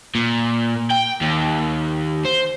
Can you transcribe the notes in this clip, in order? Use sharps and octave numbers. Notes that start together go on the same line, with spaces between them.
A#2
G5
D#2
C5